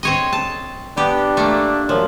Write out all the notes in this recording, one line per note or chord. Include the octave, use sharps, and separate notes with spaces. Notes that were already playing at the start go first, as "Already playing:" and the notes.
C4 C#5 D#5
A5
B3 D4 G4
A3 A#3
F#2 F3